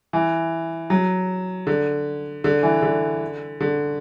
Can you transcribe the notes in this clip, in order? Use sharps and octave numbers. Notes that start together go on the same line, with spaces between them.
E3
F#3
D3
D3
E3
D3
D3